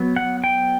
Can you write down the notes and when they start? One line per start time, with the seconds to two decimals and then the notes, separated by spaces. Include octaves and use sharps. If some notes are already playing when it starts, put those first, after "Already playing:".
Already playing: F#3 B3
0.16 F#5
0.44 G5